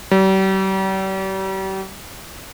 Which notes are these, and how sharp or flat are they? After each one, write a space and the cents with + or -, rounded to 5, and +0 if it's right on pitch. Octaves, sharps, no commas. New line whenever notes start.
G3 -40